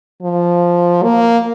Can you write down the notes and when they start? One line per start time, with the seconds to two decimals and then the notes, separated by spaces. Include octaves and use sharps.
0.23 F3
1.03 A#3